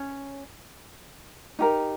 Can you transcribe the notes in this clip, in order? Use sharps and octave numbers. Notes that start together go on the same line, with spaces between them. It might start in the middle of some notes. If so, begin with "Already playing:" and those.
Already playing: C#4
D#4 G4 A#4